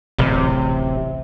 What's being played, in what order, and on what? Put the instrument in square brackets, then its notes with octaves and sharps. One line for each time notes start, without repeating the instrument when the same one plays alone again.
[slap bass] D1 A1 [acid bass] C3